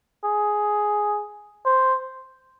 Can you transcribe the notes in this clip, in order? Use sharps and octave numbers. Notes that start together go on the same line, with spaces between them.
G#4
C5